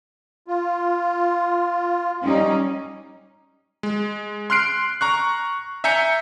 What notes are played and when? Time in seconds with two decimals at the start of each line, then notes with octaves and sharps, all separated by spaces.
0.48 F4
2.23 G3 C#4 D#4
3.83 G#3
4.50 C6 F6 F#6 C7 D7
5.01 A#5 C#6 F#6
5.84 E5 G#5 A#5 G6 C#7